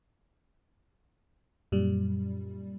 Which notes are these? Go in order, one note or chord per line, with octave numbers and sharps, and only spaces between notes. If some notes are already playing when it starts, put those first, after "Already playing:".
F#2 A#2 G3